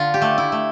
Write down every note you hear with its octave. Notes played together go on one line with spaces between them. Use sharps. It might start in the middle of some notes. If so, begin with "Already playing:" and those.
Already playing: D3 F4
G4
A3
E4
A3